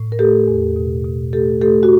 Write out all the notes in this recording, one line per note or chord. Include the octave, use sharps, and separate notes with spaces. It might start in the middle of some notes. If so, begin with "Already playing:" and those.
Already playing: A2
A#4
A3 G4 A4
E2
B2
B2
A3 G4 A4
A3 G4 A4
F#4